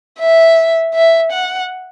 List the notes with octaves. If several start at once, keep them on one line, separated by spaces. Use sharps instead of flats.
E5
E5
F#5